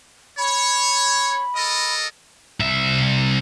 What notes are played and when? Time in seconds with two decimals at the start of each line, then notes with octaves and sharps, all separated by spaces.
0.38 C#5 B5
1.55 A4 A#4 D#5
2.60 C2 E5